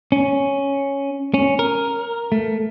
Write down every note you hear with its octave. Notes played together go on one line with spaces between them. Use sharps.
C#4
C#4
A#4
A3